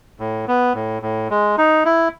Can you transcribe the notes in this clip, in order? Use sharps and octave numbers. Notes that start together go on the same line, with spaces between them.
A2
B3
A2
A2
G#3
D#4
E4